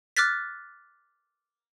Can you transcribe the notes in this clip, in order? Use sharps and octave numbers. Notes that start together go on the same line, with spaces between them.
D6 F6 F#6 A6 B6